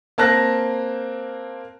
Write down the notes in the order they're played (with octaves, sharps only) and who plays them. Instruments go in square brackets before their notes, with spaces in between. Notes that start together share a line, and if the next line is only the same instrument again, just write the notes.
[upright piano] A#3 C4 A5 F#6 A#6